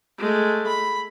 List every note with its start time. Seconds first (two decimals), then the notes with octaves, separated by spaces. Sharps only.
0.18 G#3 A3
0.67 B5